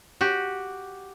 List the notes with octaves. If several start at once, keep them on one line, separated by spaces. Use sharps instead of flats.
F#4 G4